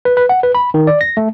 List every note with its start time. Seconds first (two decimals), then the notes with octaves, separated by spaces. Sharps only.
0.05 B4
0.17 B4
0.29 F#5
0.43 B4
0.55 B5
0.74 D#3
0.87 D5
1.01 A#6
1.17 A3